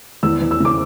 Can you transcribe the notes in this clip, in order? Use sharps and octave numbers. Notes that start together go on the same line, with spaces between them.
E2 E6
E3
E6
C#3 D6